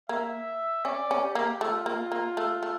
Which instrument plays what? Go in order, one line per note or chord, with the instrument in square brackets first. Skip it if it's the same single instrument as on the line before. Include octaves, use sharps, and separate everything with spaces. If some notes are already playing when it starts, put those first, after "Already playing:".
[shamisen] A#3 [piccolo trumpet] E5
[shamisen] C#4 [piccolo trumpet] D5
[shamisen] C#4
[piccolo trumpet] G4
[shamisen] A#3
[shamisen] A3 [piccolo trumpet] F4
[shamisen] A#3
A#3
A3
A3